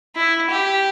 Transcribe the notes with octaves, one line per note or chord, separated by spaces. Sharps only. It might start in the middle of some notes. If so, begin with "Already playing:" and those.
E4
G4